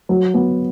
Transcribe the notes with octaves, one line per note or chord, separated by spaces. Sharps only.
F#3
B3